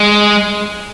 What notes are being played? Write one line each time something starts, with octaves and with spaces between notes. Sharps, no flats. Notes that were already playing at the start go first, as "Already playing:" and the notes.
Already playing: G#3